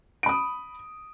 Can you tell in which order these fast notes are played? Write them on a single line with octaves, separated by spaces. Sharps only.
D7 B5 D#6